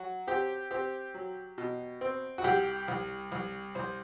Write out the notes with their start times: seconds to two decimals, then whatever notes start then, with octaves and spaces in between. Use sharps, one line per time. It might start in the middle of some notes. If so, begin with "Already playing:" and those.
Already playing: F#3 F#4
0.27 C4 G4
0.71 C4 G4
1.14 F#3
1.58 B2
2.01 C4
2.38 F#4
2.44 C2 G4
2.88 C2
3.32 C2
3.75 C2 C5